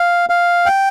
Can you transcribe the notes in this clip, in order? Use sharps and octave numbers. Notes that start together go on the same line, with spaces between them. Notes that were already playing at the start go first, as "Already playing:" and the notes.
Already playing: F5
F5
G5